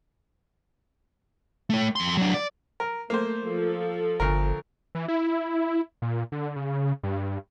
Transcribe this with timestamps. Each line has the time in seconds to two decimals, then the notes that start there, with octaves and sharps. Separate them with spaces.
1.70 A3 C#5
1.96 F2 C6
2.17 F#3 D4
2.34 D5
2.80 A#4
3.10 A3 A#3 C5
3.46 F3 A4
4.20 G1 D2 A#4
4.95 E3
5.08 E4
6.02 A#2
6.32 D3
6.56 C#3
7.03 G2